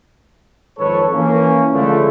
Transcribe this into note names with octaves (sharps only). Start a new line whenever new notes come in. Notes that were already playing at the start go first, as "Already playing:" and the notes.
F2 G#2 D#3 A4 B4 C#5
E3 A#3 C#4
C#2 D3 F3 A3